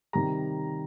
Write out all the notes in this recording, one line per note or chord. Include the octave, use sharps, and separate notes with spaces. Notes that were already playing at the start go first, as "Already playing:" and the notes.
C3 D#3 G3 A#5